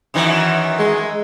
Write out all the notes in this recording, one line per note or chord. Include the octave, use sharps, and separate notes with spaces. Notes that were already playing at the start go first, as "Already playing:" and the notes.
F#2 D#3 E3
G#3